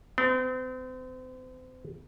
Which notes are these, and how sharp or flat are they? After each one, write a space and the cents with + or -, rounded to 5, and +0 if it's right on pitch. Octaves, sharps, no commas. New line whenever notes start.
C4 -40